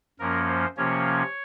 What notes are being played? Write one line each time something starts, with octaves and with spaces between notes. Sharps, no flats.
F#2 F3 A#3 C#4 A#4
C5
C3 F3 A#3 C#4 C#5